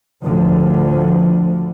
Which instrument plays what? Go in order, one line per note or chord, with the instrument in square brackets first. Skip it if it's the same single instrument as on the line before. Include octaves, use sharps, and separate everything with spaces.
[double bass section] D2 A2 D3 F3